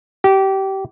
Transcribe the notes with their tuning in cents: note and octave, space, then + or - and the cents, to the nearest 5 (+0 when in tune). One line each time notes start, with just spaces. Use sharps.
G4 -25